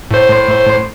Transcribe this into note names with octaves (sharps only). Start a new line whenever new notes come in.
A2 C5